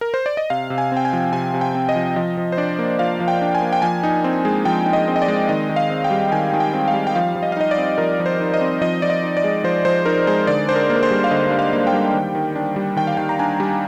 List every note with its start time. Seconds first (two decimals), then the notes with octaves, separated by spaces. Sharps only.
0.01 A#4
0.14 C5
0.26 D5
0.37 D#5
0.50 C3 F5
0.70 C3
0.78 G#5
0.92 C4 G5
1.05 G#5
1.13 F3
1.33 C3 G#5
1.54 C3
1.61 G5
1.75 C4
1.89 D#5
1.96 F3
2.16 F3 D#5
2.37 F3
2.52 C5
2.58 D4 D5
2.79 A#3
2.99 F3 F5
3.20 F3
3.28 G5
3.41 D4
3.55 G#5
3.62 A#3
3.73 G5
3.82 F3 G#5
4.03 D#4
4.24 C4
4.45 G#3
4.65 F3 G5
4.86 D#4
4.93 D#5
5.08 C4
5.16 D#5
5.22 D5
5.28 G#3
5.49 D#3 D#5
5.69 D#3
5.76 F5
5.90 C4
6.04 G5
6.11 G3
6.32 D#3 G#5
6.53 D#3
6.60 G5
6.74 C4
6.88 F5
6.94 G3
7.07 G5
7.15 F3 F5
7.36 F3
7.43 D#5
7.52 F5
7.57 D#4 D#5
7.71 D5
7.77 C4
7.98 F3 A#4
8.20 F3
8.26 C5
8.40 D#4
8.54 D#5
8.61 C4
8.81 F3 D#5
9.02 F3 D5
9.10 D#5
9.24 D#4
9.37 D5
9.44 G#3
9.64 F3 C5
9.85 F3 C5
10.06 D#4 A#4
10.27 G#3 C5
10.47 D3 D5
10.69 D4 C5
10.75 A#4
10.90 A#3
10.96 A#4
11.03 C5
11.11 G3
11.24 F5
11.31 D3 D#5
11.51 D4
11.59 F5
11.73 A#3
11.87 G5
11.93 G3
12.14 D#3
12.35 D#3
12.56 D4
12.76 G3
12.97 D#3 G5
13.07 F5
13.17 D#3 G5
13.29 A#5
13.39 D4 G#5
13.60 G3